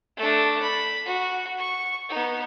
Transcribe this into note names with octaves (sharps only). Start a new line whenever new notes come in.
A3 D4
B5
F#4
C#6
B3 D#4